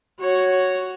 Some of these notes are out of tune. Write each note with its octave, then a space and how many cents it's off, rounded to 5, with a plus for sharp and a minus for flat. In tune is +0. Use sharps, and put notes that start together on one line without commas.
F#4 +0 C#5 +0